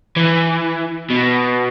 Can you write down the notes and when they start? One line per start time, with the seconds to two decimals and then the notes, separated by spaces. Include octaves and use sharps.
0.16 E3
1.10 B2